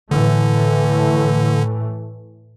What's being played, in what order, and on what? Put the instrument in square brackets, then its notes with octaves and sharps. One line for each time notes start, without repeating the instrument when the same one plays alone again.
[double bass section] A2 E3 A3 [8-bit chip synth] D3